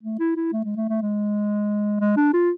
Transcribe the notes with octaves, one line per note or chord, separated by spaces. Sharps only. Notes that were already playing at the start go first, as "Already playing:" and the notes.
A3
E4
E4
A3
G#3
A3
A3
G#3
G#3
D4
F4